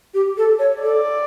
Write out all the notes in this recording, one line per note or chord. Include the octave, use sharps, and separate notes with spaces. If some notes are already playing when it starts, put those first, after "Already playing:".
G4
A4
C#5
A4 D5